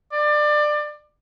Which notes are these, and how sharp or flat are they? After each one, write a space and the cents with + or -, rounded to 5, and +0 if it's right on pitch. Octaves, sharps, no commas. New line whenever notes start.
D5 +25